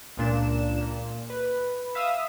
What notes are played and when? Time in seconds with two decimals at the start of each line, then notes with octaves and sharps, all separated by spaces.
0.17 C#2 A#2 D4 E7
0.81 A#2
1.30 B4
1.95 E5 F5 D#6 E6